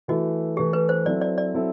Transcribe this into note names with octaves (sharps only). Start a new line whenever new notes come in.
E3 A3 E4 F#4
E3 A3 E4 G4
B4
C5
F#3 C4 E4 A4 D5
D5
D5
F#3 C4 E4 A4